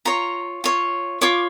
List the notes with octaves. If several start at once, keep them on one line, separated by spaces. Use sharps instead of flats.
F4 C#5 A#5
F4 C#5
F4 C#5 D6